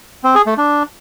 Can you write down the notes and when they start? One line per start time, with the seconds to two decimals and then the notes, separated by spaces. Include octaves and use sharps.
0.24 C4
0.35 G#4
0.46 A3
0.58 D4